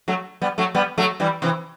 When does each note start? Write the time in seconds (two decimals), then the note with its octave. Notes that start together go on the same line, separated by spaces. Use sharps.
0.08 F#3 A3
0.42 G3 B3
0.58 F#3 A3
0.75 G3 B3
0.98 F#3 A3
1.20 E3 G3
1.42 C3 E3